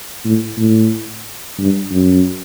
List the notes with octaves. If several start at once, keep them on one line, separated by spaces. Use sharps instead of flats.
A2
A2
G2
F#2